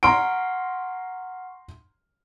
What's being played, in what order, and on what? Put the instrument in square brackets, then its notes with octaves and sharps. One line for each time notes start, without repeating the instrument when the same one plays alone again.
[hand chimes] F#5 C#6 F6 [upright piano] A#5 C6 D7